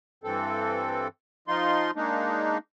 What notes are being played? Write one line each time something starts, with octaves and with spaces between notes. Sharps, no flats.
G2 E3 C4 A4
F3 D#4 F4 C6
G#3 A#3 D4 D#4